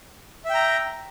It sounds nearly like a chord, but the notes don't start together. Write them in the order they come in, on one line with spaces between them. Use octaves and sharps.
E5 G5 A#5